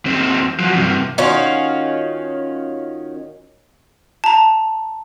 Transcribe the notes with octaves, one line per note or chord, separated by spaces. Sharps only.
D#2 C4
F3 F#3
G2 C3
D#3 C#4 F4 F#4
A5 A#5